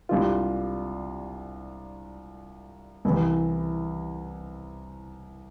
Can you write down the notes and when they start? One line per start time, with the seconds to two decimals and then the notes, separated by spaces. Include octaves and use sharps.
0.09 C2 C3 G3 D4 F4
3.05 C2 C3 E3